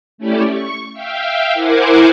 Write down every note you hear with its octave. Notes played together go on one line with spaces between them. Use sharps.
A3 C#4 E4 G4 D5
C#6
E5 F5 G5
E4 A#4 C5 F#5 G#5 D6